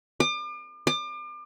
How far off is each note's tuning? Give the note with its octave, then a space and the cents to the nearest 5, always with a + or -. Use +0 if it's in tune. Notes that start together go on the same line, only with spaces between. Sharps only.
D6 +40
D6 +35